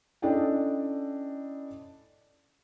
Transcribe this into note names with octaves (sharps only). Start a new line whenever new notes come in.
C#4 D4 E4 A4 D#5 G5